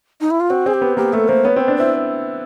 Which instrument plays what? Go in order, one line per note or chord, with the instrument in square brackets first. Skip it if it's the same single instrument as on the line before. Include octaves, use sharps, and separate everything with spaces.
[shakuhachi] D#4
E4
F4
[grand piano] C4 [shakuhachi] F#4
[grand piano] C4 [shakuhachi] G#4
[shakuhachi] G4
[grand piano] B3
[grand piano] A#3 [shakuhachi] G4
[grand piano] A3 [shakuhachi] A4
[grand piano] A#3 [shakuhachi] C5
[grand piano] B3 [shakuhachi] C#5
[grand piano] C4
[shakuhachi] C5
[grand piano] D4
[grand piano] E4 [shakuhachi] C5